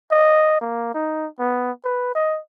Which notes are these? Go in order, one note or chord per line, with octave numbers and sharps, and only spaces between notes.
D#5
A#3
D#4
B3
B4
D#5